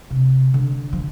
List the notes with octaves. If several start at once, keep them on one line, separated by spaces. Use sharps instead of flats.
C3
D3
F3